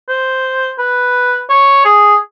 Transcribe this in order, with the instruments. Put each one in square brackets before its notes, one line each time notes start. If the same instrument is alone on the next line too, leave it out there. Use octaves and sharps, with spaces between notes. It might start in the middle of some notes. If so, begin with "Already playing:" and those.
[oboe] C5
B4
C#5
G#4